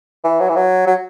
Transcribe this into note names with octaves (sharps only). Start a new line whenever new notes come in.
E3
F#3
E3
F#3
F#3